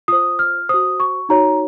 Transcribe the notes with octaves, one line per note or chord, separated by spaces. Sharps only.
F4 C5 D#6
F6
F#4 C5 D#6
C#6
D#4 F#4 C#5 A#5